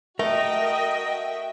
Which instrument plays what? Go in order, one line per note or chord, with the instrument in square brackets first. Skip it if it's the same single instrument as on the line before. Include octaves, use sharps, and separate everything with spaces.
[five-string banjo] A3 [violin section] F#4 E5 G5 [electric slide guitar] A#4 [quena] D#5